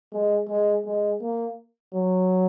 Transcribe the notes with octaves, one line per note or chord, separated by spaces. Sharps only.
G#3
G#3
G#3
A#3
F#3